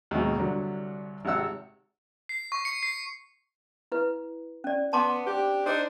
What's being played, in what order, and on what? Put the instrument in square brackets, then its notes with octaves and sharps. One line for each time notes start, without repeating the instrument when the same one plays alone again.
[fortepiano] D#2 G#2 B2
C2 D3 F#3
G#1 C3 F#5 E6
[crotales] C7
C#6
C#7
C7
[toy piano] E4 B4
C#4 D5
[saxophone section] B3 [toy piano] A5 C6 D6
[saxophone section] C4 D4 G4
D4 D#4 C5